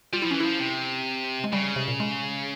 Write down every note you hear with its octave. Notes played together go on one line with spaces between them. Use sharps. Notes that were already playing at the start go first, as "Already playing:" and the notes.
G3 F4
F3 E4
E3 C#4
F3 E4
C3
G#3
C#3 G3
G3
C3
A#2
G#3